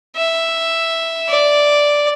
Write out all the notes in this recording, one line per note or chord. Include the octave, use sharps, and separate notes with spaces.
E5
D5